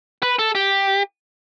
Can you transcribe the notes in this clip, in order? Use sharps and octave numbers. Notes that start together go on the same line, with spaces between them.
B4
A4
G4